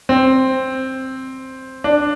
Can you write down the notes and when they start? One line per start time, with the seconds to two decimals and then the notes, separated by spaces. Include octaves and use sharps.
0.09 C4
1.84 D4